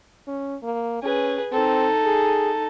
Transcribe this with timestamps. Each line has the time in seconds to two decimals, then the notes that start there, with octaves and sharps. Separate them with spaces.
0.28 C#4
0.63 A#3
1.03 C#4 G#4 B4
1.52 C4 D#4 A4
2.05 G#4